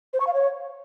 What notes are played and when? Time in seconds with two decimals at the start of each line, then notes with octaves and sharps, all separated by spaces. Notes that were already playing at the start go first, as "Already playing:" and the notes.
0.13 C5
0.20 C#6
0.27 F5
0.34 C#5